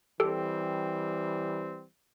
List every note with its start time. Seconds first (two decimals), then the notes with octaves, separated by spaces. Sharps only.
0.19 E3 G3 C4 G4 A4